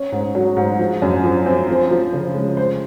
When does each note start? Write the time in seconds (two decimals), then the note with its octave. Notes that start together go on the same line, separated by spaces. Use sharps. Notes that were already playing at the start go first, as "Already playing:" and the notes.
Already playing: C#4
0.12 G#2
0.35 F#3
0.57 G#2
0.79 F3
1.02 F#2
1.24 F3
1.46 C4
1.69 F3
1.91 F3
2.13 C#3
2.35 G#3
2.57 C5